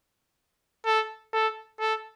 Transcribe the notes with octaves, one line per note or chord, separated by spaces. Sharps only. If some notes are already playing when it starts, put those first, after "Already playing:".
A4
A4
A4